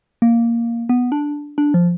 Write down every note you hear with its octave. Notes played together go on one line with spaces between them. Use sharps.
A#3
B3
D4
D4
F3